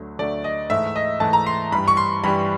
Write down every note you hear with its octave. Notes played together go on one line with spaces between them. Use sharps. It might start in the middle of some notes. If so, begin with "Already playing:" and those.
Already playing: D2 D3 F#3 A3
D2 D3 F#3 A3 D5
D#5
G#2 E3 A3 E5
D#5
G#2 E3 A3 A5
A#5
C6
G2 E3 G3 B5
C#6
C6
G2 E3 G3 B5